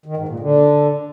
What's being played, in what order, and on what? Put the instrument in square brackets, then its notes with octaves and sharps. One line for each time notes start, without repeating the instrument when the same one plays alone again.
[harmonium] D#3
G#2
A#2
D3